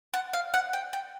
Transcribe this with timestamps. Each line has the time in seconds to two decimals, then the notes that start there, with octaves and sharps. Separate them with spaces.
0.14 F#5
0.33 F5
0.54 F#5
0.73 G5
0.93 G5